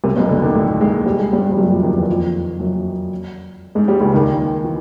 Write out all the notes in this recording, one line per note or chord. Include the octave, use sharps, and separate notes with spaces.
C2 C3
B1 B2
D2 D3
D#2 D#3
A2 A3
G#2 G#3
G3
G#3
G2 G3
G3
F#2 F#3
F2 F3
D#2 D#3
E2 E3
F2 F3
F#2 F#3
G#2 G#3
G2 G3
C#2 C#3
D#2 D#3
E3